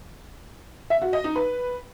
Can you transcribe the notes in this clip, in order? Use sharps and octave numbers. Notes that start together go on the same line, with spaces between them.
E5
F#4
D#5
D#4
B4